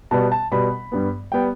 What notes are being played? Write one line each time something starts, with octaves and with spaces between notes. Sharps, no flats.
B2 G3 B3 A5
A5
B2 G3 B3 B5
G2 G3 B3
G3 B3 G5